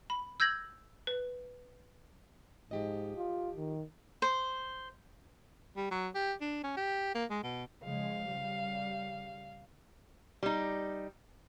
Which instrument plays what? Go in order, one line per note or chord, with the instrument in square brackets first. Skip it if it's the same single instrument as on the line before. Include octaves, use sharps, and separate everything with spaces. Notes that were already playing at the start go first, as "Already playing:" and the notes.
[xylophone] B5
E6 G6 G#6 A#6 F#7
B4
[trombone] G#2 [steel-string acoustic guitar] F3 G4 D#5
[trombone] F4
D#3
[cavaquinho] C5
[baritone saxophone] G3
F#3
G4
D4
C#4
G4
A#3
G#3
B2
[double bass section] C#3 F3 G#3 [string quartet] F5
[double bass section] C#3 G3
[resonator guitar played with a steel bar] G3 D#4